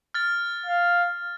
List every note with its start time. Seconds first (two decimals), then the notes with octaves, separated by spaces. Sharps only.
0.14 F6 A6
0.66 F5